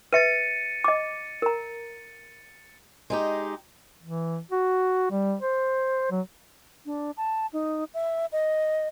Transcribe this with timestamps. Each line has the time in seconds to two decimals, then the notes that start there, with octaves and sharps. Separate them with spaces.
0.13 B4 E5 A6 C#7 D#7
0.84 D#5 D6
1.42 A#4 A#5
3.10 G#3 D#4 G4
4.03 E3
4.51 F#4
5.11 G3
5.41 C5
6.11 F#3
6.86 D4
7.17 A5
7.53 D#4
7.94 E5
8.32 D#5